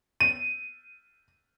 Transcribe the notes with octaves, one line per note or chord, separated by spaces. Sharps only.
D#7